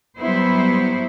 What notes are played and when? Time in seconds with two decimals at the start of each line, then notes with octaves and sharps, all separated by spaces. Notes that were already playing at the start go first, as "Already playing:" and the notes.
0.18 F#3 G3 B3 E4 C5